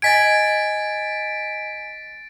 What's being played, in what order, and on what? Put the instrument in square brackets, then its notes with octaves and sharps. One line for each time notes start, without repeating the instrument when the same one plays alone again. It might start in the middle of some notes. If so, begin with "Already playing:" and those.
[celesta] D#5 G#5 G#6 [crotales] A6 B6 D7